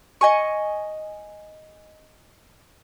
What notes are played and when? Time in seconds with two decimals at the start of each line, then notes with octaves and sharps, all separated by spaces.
0.21 D#5 G#5 C#6